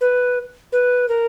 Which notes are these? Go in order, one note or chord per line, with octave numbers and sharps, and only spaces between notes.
B4
B4
A#4